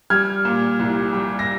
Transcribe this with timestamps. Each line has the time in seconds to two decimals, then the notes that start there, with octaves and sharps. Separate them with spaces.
0.10 G3 F6 G#6
0.45 A#2
0.79 C2
1.13 G3
1.39 A#6